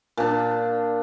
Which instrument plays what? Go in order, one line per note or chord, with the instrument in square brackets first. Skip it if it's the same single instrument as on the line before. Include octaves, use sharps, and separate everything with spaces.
[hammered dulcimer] A#2 D4